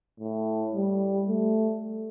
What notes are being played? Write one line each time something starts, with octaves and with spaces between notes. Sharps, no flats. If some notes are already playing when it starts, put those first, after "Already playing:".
A2
G3
A3